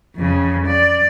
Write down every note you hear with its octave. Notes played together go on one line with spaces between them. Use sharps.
F2 C#3
D5